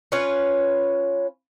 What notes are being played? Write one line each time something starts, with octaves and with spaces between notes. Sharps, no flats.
C#4 F4 B4 C#5